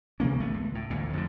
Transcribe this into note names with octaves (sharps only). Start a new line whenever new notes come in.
C3 E3 A#3 C#4
G#1 A3 B3
C#2
A2
A1 D2 A#2
F2 G#2 B2 D3